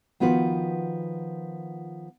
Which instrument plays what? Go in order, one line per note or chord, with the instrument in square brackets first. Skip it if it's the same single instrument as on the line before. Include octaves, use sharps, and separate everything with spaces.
[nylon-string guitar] D#3 F3 B3 F4 F#4 B4